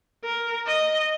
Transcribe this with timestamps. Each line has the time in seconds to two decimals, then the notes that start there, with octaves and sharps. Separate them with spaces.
0.24 A#4
0.67 D#5